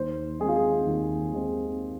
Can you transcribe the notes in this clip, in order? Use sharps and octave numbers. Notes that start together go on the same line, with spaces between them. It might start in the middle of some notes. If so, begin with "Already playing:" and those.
Already playing: D#2 C5
D#3 G#3 C4 G#4
F4
G#4
D#2
D#3 G#3 C4